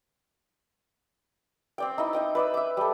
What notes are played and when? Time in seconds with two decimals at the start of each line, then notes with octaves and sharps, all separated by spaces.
1.78 C4 D5 G5
1.98 D#4 E4 D#5
2.13 D#5 G5 D#6
2.35 B4 D5 E6
2.54 E5 D6
2.77 G3 A4